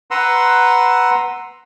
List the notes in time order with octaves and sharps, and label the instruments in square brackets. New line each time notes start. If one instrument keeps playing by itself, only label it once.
[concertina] B4 F#5 A#5 C6 E6